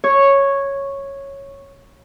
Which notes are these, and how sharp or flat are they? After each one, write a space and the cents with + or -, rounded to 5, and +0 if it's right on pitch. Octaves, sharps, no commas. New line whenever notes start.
C#5 -5